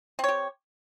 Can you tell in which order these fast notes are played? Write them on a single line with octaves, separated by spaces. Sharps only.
C4 C#5 G4